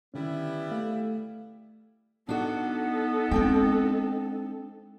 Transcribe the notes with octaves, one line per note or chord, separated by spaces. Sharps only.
D3 D#3 G3 B3 C#4 E4
A3 F5
B3 D4 D#4 F#4 A4
G#3 C4 D4 G5